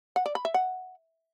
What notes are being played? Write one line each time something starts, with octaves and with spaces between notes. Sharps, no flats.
F#5
D5
B5
E5
F#5